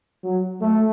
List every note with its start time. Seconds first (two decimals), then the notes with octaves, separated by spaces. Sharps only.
0.23 F#3
0.61 A3